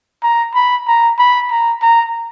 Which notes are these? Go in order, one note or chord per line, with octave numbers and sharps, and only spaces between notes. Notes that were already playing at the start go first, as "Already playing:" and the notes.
A#5
B5
A#5
B5
A#5
A#5